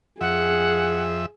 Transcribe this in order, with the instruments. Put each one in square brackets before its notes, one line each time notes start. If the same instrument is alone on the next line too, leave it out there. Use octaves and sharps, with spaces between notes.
[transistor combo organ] F2 E5 [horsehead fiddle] G#4 [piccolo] F#5